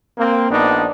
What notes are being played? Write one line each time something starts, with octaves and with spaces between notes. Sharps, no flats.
A#3 C4
A#1 B3 D4 D#4